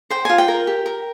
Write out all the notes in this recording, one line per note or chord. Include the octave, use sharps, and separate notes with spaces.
C5 G5
F4 G#5
G5
A#4
G4
A#4